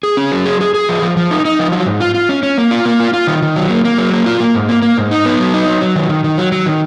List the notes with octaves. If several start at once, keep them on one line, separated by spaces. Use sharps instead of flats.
G#4
C#4
F#3
G#4
G#4
G#4
F3
F3
F3
D#4
D#4
F3
F#3
G#2
F4
F4
C#4
C#4
A#3
F4
A#3
F4
F4
D#3
D#3
F#3
A#3
A#3
F#3
A#3
F4
A#3
G#2
A#3
A#3
G#2
D#4
B3
F#3
D#4
F#3
F#3
D#3
D#3
D#3
F#3
F#3
D#3